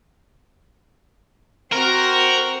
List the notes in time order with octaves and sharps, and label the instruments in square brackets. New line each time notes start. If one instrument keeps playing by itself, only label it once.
[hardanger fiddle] C4 F#4 [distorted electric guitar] A#4